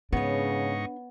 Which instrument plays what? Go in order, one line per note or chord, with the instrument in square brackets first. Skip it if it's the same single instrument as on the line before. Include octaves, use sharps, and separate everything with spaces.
[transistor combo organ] G#2 D#4 C#6 [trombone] C#3 [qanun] B3 C#5 [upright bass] D4